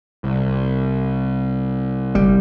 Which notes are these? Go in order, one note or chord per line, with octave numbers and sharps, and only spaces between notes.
C2
G1 G3